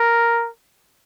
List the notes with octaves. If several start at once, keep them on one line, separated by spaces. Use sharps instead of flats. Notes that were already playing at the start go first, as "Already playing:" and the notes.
Already playing: A#4